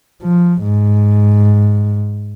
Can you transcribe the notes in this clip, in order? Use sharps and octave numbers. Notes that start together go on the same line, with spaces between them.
F3
G#2